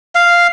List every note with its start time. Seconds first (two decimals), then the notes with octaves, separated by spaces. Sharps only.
0.15 F5